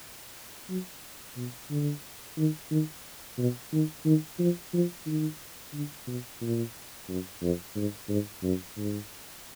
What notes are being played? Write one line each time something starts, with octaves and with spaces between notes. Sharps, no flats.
F#3
B2
D3
D#3
D#3
B2
D#3
D#3
F3
F3
D#3
D3
B2
A#2
F#2
F2
G#2
G#2
F#2
G#2